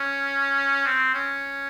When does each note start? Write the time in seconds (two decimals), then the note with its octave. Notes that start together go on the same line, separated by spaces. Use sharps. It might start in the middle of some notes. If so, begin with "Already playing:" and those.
Already playing: C#4
0.86 C4
1.14 C#4